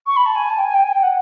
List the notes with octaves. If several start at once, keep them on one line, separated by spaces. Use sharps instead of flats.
C#6
B5
A5
G#5
A5
G5
G#5
G5
G#5
G5
F#5